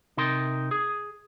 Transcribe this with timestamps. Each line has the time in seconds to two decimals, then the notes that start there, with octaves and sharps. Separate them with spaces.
0.17 C3 D#4 A#4 C6
0.71 G#4